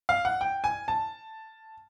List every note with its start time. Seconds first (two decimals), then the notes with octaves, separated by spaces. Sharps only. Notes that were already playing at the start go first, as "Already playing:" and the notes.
0.09 F5
0.25 F#5
0.41 G5
0.64 G#5
0.88 A5